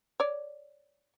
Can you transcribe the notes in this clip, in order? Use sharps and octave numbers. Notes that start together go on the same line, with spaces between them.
C#5 D5